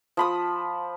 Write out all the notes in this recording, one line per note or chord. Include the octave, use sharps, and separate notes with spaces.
F3 B5 D#6